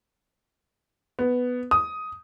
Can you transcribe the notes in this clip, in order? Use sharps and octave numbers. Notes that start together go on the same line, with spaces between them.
B3
D#6